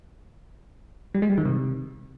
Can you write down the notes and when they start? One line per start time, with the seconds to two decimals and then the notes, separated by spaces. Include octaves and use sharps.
1.14 G3
1.22 G#3
1.30 G3
1.38 D#3
1.45 C3